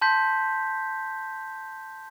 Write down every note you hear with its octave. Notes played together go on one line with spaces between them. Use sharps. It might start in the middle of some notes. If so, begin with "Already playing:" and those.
A5 C6 G6 B6